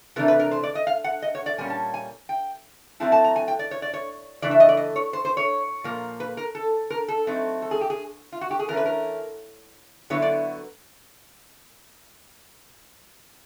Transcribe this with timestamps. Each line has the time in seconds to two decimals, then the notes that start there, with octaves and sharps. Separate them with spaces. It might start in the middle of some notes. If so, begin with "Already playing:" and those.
0.16 C3 E3 A3 D4 A#4
0.28 B4
0.40 A#4
0.51 C5
0.63 D5
0.75 D#5
0.87 F5
1.04 F#5
1.22 D#5
1.35 C#5
1.46 D5
1.58 A#2 G3 A#3 C#4 G#5
1.70 A5
1.94 G#5
2.29 G5
3.00 F#3 A3 C4 E4 A5
3.12 A5
3.24 A#5
3.36 G#5
3.48 G5
3.59 D5
3.71 C#5
3.82 D5
3.94 C#5
4.42 C#3 E3 A3 D4 D5
4.51 E5
4.60 D#5
4.69 D5
4.77 D#5
4.96 C#5
5.13 C5
5.25 C5
5.37 C#5
5.84 A#2 F3 A#3
6.20 B4
6.37 A#4
6.55 A4
6.90 A#4
7.08 A4
7.27 F#3 A3 C4 D#4
7.62 A4
7.71 G#4
7.81 G4
7.90 G#4
8.32 F4
8.41 F#4
8.51 G4
8.59 G#4
8.68 E3 A3 C#4 A#4
8.77 B4
8.86 A#4
10.10 D3 F#3 B3 E4 C#5
10.22 D5